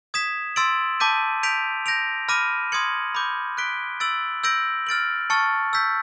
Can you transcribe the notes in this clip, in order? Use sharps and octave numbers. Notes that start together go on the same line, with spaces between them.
D#6 G#6 B6 E7
C6 E6 A6 D7 F#7
A5 D6 G6 B6 D#7
G6 B6 D7 F7
G6 A#6 D7 F7
B5 D6 F6 A#6 D#7
C6 D#6 G#6 C#7 F#7
B5 D6 G6
F#6 B6 D7 G7
E6 A6 D7 F#7
E6 G6 A#6 D7 F#7
F6 A6 D7 F#7
A5 C#6 F6 A6 C#7
E6 G6 B6